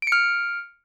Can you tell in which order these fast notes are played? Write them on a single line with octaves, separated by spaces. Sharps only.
D7 C#7 F6